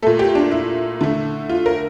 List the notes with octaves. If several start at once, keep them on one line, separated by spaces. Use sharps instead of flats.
A#2 A3 A4
G4
D4
E4
D3 A3
F4
A#4